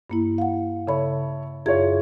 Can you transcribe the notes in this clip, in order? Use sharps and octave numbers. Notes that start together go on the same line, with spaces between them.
G2 A#3 E4
F5 F#5
C#3 A4 C#5 E5 B5
F#2 E4 F4 G#4 C#5 G#6